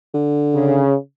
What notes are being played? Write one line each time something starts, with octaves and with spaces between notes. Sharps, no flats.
D3
C#3